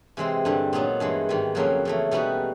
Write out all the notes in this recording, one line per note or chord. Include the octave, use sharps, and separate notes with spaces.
C3 E3 G#3 C4
G2 D3 G3
A#2 F#3 B3 D#4
G2 E3 G#3
G#2 D#3 G3
F2 C#3 F#3 A#3 C#4
C#3 E3 A3
B2 G3 B3 D#4 F#4